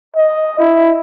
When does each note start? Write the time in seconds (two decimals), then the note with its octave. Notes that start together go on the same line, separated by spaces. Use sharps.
0.16 D#5
0.59 E4